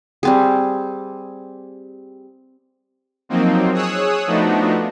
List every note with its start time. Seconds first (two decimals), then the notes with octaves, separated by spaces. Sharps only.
0.23 G3 C4 G#4
3.29 F3 F#3 A#3 C4 D#4
3.74 G#4 C#5 D#6 E6 F#6
4.27 F3 A3 B3 D4 D#4 F#4